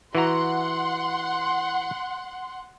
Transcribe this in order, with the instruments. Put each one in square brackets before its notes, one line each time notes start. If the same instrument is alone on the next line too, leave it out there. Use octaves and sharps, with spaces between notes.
[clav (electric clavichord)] E3 F#4 A#5 [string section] F#5 C6